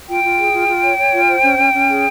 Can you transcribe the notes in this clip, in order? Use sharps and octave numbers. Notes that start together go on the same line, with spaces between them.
F4 G5
F4
G#4
F4
F4
C#5
C#5
F4
C5
C#4
C#4
C#4
G#4